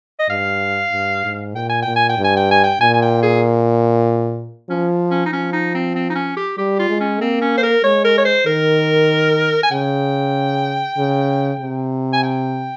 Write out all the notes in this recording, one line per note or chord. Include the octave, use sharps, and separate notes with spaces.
D#5
G2 F5
G2
G#2
A#2 G5
G#5
A#2 G5
G#5
G5
G2
G#5
G5
G#5
G5
A#2 G#5
G#5
G5
G#4
F3 C#4
C#4
D#4
F3 C#4
D#4
C4
C4
D#4
C#4
G4
G3 G4
F4
G#3
C#4
A#3 C4
C#4
C5
A#4
G#3 C#5
A#4
C#5
C5
D#3 A#4
G#5
C#3 G5
C#3
C3
G#5
G5